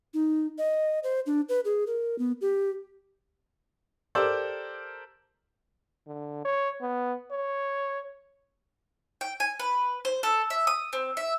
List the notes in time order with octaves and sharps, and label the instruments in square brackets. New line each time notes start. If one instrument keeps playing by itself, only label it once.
[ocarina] D#4
D#5
C5
D4
B4
G#4
A#4
B3
G4
[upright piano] G4 A4 A#4 C5 D5 E6
[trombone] D3
C#5
B3
C#5
[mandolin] G5
G#5
B4
C5
A4
E5
D#6
C4
E5